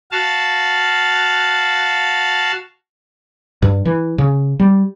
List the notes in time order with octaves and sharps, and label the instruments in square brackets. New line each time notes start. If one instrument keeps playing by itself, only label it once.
[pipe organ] F#4 F5 A5
[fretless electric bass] G2
E3
C#3
G3